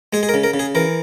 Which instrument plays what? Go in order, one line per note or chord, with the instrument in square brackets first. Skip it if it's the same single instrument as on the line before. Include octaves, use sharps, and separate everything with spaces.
[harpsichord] G#3 G#4
G#4
A#4
C#3
A#4
C#3
G#4
E3 A#4